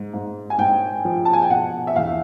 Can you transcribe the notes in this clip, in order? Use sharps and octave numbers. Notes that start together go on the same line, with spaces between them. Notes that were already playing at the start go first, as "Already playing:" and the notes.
Already playing: G#2
G#2
G#5
G#2 G5
F3
A5
G#5
G5
B2 F#5
E5
E2 F5